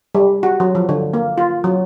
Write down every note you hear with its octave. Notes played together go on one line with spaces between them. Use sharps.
G3
F#4
F#3
F3
D3
A#3
F4
F#3